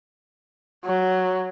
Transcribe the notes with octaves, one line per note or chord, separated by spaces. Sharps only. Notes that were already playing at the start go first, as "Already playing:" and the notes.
F#3